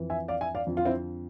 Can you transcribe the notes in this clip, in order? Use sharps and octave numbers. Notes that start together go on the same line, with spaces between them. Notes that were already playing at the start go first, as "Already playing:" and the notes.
Already playing: F2 E3
E5 G#5
D5 F5
E5 G#5
D5 F5
F2 D3 F3
F4
C4 E4